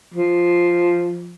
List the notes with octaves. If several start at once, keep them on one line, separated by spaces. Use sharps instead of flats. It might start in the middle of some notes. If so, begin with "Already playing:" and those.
F3